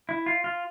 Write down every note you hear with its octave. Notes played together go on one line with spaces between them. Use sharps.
E4
F4
F4